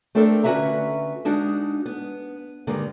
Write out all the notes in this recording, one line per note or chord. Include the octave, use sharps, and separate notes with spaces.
A3 C4 D4 A4 A#4
D3 C#4 F#4 B4 E5 A#5
G#3 D4 D#4 F#4
B3
G2 D3 D#3 G#3 A#3